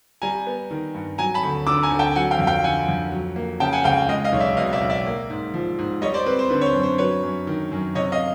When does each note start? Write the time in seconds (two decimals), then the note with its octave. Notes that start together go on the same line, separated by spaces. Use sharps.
0.22 G3 G#5 A#5
0.47 B3
0.71 D#3
0.94 G2
1.18 F#3 G#5 A#5
1.34 A5 B5
1.43 D2
1.67 D3 D6 E6
1.83 G#5 A#5
1.91 D2
1.99 G5 A5
2.15 F#3 F#5 G#5
2.31 F5 G5
2.39 F2
2.47 F5 G5
2.64 D3 F#5 G#5
2.88 F2
3.12 F#3
3.36 A#3
3.60 C#3 G5 A5
3.73 F#5 G#5
3.84 C#2 F5 G5
4.08 G#3 D#5 F5
4.24 D#5 F5
4.33 B1
4.40 D5 E5
4.57 B2 D#5 F5
4.73 D5 E5
4.81 B1
4.90 D5 E5
5.06 A#3
5.30 G#2
5.54 F3
5.79 G#2
6.02 G3 C#5 D#5
6.14 C5 D5
6.26 C4 B4
6.39 C5
6.50 D3 B4
6.61 C#5
6.66 C5
6.75 F#2
6.83 C5
6.98 F#3 B4 C#5
7.23 F#2
7.47 D#3
7.72 F#2
7.95 C3 C#5 D#5
8.12 D#5 F5